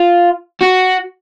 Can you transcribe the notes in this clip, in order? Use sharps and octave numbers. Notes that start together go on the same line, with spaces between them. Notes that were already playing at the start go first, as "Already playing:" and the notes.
Already playing: F4
F#4